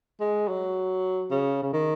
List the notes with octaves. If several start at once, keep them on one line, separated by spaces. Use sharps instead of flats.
G#3
F#3
C#3
C#3
D#3